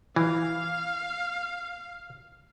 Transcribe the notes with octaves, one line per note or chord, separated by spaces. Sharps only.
E3 F5